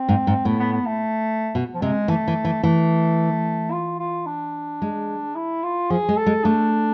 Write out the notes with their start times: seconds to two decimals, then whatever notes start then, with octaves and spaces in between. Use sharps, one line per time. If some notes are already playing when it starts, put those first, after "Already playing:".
Already playing: C4
0.09 G#2
0.27 G#2
0.45 A2 B3
0.59 B3
0.72 B3
0.86 A3
1.55 B2
1.74 F3
1.82 C3 G#3
2.08 E3 A3
2.28 E3
2.45 E3
2.63 E3 A3
3.72 F4
3.99 F4
4.27 D4
4.82 G#3
5.36 E4
5.63 F4
5.90 F3 G#4
6.09 G#3
6.17 A4
6.26 G#3
6.44 A3 D4